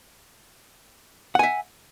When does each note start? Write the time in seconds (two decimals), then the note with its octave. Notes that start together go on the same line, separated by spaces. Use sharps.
1.35 F#5
1.39 G#5
1.43 E5